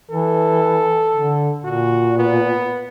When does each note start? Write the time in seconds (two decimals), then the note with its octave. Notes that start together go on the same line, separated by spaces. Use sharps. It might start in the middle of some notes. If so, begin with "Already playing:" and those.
0.11 E3 A4
1.15 D3
1.65 A#2 F#4
2.18 B3